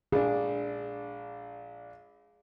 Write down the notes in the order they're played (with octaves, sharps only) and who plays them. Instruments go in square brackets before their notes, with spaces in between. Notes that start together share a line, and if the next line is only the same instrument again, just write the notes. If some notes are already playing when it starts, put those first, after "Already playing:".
[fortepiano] A#1 D4 [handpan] G#4